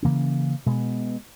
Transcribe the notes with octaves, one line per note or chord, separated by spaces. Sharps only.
C#3 E3 A#3 C#4
B2 G#3 B3